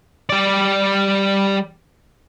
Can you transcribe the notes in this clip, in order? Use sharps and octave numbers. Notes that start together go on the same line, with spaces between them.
G3 D5